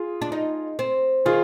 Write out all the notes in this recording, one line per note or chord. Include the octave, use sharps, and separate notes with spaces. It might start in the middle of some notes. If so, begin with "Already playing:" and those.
Already playing: F4 G#4
D4
D#4
C4
D#3 F4 G#4